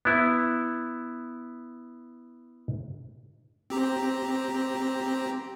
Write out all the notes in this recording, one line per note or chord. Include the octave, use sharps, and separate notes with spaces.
B3 E4
C4 G4 A#5